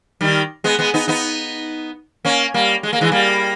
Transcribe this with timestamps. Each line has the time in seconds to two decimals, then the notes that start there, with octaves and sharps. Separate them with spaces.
0.21 D#3 G3
0.64 G#3 B3
0.79 G#3 B3
0.94 B3 D#4
1.08 B3 D#4
2.25 A#3 C#4
2.54 G3 A#3
2.83 G#3
2.93 A#3
3.01 E3 G#3
3.12 G3 A#3